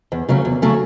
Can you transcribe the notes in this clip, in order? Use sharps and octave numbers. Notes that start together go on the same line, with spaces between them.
E2
C#3 F#3 A3 C#4
E2
C#3 F#3 A3 C#4